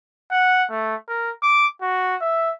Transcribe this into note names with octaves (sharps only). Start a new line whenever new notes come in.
F#5
A3
A#4
D6
F#4
E5